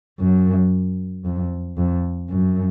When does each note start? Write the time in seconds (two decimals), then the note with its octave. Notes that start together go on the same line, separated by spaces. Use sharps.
0.20 F#2
1.25 F2
1.77 F2
2.30 F#2